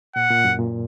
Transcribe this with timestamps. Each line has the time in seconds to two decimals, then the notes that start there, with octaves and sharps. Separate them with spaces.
0.16 A#2 F#5
0.30 A#2
0.44 F#2
0.59 A#2